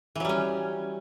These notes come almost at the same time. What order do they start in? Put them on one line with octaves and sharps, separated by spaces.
E3 F#3 G3 C#4